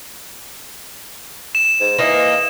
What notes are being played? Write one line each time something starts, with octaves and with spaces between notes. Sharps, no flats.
E7
G#2
E3 A#3 D#4